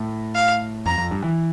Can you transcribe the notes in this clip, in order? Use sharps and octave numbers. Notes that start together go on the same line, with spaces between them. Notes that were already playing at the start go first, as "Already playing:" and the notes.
Already playing: A2
F5
F2 A#5
F2
G2
E3